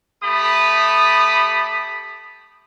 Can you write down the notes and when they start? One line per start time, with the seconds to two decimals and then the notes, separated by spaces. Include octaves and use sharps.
0.22 A3 G4 B5 D#6